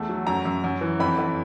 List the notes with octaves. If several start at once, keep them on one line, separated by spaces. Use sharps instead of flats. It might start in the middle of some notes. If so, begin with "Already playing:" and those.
Already playing: E2 A3
F#3
F#2 A#5
F#2
F#2
E3
F2 B5
F2